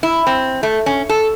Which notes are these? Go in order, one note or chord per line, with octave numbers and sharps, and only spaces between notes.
E4
C4
A3
C#4
A4